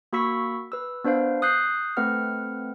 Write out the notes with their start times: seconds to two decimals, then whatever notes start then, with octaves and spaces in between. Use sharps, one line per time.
0.13 A#3 F#4 B5 C#6 E6 B6
0.72 B4 E6
1.04 B3 D4 B4 C5 F5
1.42 D#6 F#6 G6 C7
1.97 A3 C4 B4 F#5 F6